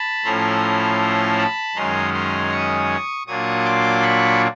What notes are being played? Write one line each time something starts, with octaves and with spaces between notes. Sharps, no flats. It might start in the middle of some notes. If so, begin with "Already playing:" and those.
Already playing: A5 B5
A2 F3 A3 C#4 E4 A#5 C6
A5 B5
F#2 D#3 G#3 C#4 A#5 C6
A#5 C6
C#6 D#6
A#2 F#3 A#3 D4 F4 C#6 D#6
C6 D6
B5 C#6